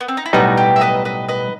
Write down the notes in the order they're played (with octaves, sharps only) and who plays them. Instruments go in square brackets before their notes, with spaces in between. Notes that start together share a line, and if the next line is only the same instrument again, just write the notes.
[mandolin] B3
C4
D#4
E4
[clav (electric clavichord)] B1 A2 G3 B3 D#4 [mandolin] F#4
[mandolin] G4
E5
B4 D#5
B4 D#5
B4 D#5